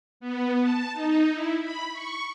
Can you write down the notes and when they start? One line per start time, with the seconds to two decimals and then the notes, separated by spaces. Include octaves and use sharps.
0.20 B3
0.62 A5
0.93 D#4
1.33 E4
1.62 B5
1.92 C#6